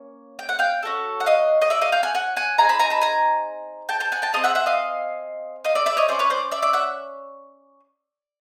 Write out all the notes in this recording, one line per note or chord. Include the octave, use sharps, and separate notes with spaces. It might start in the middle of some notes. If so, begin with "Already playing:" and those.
Already playing: A#3 C#4
G5
F#5
F5 G5
C#4 F#4 A4
F#5
D#5 F5
D#5
D5 E5
D#5 F5
F5 G5
F#5 G#5
F#5 G#5
F#5 G#5
C4 D#4 G#4 G#5 A#5
A5 B5
G#5 A#5
A5 B5
G#5 A#5
G5 A5
G5 A5
F#5 G#5
G5 A5
C4 F4 G#4 D#5 F5
E5 F#5
E5 F#5
D#5 F5
D#5 F5
D5 E5
D5 E5
C#5 D#5
C#4 E4 G#4 C5 D5
B4 C#5
C5 D5
D5 E5
D5 E5
E5 F#5